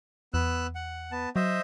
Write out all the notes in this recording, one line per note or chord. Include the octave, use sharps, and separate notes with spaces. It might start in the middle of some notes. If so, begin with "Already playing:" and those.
E2 B3 E6 F#6
F#5
B3 A5
F#3 C5 D#5 E5